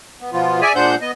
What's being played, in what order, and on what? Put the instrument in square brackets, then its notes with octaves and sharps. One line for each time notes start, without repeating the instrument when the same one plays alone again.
[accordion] B3
B2 F3 B3 F4
G#4 D5 E5 G#5
A#2 G#3 D4 C5 F#5 G6
B3 D#5